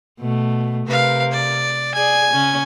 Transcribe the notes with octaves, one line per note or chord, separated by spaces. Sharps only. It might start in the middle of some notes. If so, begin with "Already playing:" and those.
B2 A3
C3 A#4 B4 F5
D5
G#4 D5 G#5
C#3 C#4